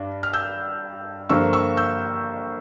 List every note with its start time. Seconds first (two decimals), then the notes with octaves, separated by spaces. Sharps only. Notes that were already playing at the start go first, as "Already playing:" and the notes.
Already playing: G2 D4
0.23 F6
0.33 E6 G6
1.29 G2 D3 F3 A#3 C#6 E6
1.53 C#6 E6
1.77 E6 G6